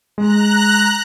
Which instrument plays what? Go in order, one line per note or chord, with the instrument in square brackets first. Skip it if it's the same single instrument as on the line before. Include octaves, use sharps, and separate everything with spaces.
[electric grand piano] G#3 [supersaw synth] A#5 F#6